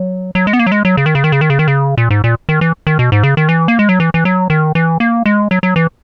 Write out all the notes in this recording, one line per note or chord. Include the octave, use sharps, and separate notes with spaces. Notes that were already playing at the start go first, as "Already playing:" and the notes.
Already playing: F#3
F#3
G#3
B3
A#3
F#3
G#3
F#3
C#3
D#3
C#3
D#3
C#3
D#3
C#3
D#3
C#3
A#2
G#2
A#2
D#3
E3
D#3
B2
G#2
C#3
D#3
E3
A#3
G#3
F#3
E3
E3
F#3
D#3
E3
A#3
G#3
F#3
F#3
E3